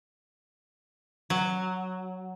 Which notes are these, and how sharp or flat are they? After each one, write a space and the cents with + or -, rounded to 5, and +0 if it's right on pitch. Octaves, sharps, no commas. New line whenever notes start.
F#3 +0